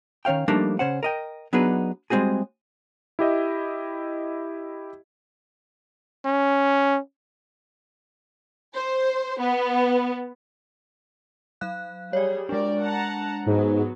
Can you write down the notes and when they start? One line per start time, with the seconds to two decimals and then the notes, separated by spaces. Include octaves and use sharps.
0.25 D#3 C#4 C#5 F5 G5
0.48 F3 G3 A3 A#3 D4 D#4
0.79 C#3 C#4 C5 F#5
1.03 A#4 D#5 G5
1.53 F#3 B3 D4 D#4 G#4 B4
2.10 G3 G#3 B3 C4 F#4 G#4
3.19 E4 G4 D#5 E5
6.25 C#4
8.75 C5
9.41 B3
11.61 F#3 F5 F#6
12.13 G3 G#4 C#5 D5
12.49 G#3 D4 A#4 D5
12.82 F#5 A5 A#5
13.46 G#2 F#3 B3